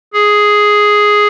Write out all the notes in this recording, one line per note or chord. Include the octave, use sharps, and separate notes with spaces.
G#4